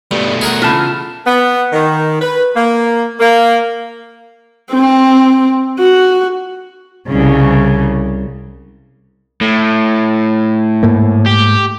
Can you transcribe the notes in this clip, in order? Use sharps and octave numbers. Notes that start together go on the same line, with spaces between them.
G2 B2 A3
G#4 A#4 F#5
C#3 E3 F4 A5
B3
D#3
B4
A#3
A#3
C4
F#4
C2 C#3
A2
G#2 A3 A#3
G4